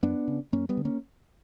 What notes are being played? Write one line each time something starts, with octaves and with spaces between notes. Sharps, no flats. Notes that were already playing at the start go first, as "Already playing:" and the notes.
F#2 B3 D4
C#3
F#2 A#3 C#4
G3 B3
D3
A#3 C#4